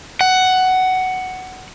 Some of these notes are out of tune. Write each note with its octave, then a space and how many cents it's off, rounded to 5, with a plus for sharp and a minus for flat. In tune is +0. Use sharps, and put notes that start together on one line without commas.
F#5 +10